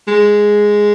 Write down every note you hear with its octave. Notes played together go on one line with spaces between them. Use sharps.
G#3